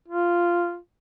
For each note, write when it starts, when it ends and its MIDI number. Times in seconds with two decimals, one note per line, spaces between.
0.08 0.77 65